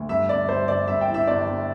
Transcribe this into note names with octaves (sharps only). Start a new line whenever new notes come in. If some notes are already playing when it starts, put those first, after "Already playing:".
Already playing: D2
G2 E5
G1 D5
G2 C5
G1 D5
G2 E5
G5
E3
E5
G1 D5
G1